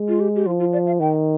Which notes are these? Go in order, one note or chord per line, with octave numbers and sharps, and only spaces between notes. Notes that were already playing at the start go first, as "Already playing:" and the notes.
Already playing: G#3
F4
G4
G4
F3 F4
F4
D5
F5
D#3 G5